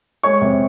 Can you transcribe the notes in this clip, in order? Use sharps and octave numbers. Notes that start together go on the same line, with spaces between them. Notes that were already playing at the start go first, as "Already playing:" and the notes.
G#3 C#5 C#6
C3